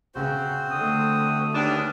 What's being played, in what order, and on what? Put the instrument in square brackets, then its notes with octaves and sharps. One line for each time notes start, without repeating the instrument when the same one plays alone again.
[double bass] C#3 [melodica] C4 F#4 C5
[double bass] D3 A3 [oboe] D#6
[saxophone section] D#2 D4 [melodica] C#4 G#4 B4